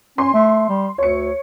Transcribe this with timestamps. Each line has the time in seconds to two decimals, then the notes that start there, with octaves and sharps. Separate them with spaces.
0.18 C#4 C6
0.34 A3
0.69 G3
0.98 D2 C#5 C#7